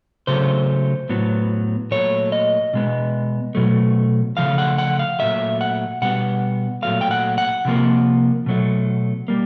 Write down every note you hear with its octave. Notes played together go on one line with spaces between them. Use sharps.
C#3 F#3 A3 C5
A2 F#3 B3
A#2 F#3 A3 C#5
D#5
B2 G#3 B3
B2 F#3 A3
C#3 F3 A3 F5
F#5
F#5
F5
A#2 F#3 A3 E5
F#5
B2 G3 B3 F#5
A#2 F#3 A3 F5
G5
F#5
F#5
C3 F3 A#3
B2 F#3 A3
G3 A#3